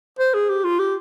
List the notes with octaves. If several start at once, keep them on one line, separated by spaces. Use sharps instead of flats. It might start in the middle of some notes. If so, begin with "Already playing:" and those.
C5
G#4
G4
F4
G4